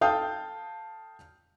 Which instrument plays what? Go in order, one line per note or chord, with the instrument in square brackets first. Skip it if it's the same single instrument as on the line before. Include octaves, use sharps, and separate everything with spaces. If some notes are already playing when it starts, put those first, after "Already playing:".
[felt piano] A4 F5 G5 A5 D#6 G6